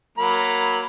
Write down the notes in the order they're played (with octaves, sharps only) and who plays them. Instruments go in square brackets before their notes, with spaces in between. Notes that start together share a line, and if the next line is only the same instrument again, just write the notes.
[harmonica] F#3 A#3 B5